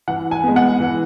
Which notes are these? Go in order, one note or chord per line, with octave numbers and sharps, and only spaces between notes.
E3 F#5
G#5
G#3 B3
F#5
E3